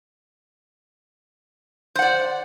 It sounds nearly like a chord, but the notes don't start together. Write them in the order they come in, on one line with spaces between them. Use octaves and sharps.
C5 F#5 D5